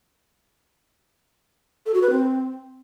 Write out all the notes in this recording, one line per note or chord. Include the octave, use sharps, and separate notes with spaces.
A4
F#4
B4
C4